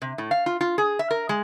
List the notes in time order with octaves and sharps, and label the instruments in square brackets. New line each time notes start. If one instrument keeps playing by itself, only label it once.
[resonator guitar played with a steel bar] C3
A2
F5
F4
F4
G#4
E5
A#4
G#3